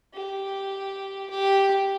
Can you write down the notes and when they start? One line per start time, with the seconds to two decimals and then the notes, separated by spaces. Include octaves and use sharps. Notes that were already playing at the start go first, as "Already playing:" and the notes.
0.14 G4
1.30 G4